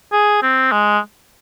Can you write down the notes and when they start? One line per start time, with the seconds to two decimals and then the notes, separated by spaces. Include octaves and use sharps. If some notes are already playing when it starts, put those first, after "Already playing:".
0.12 G#4
0.43 C4
0.72 G#3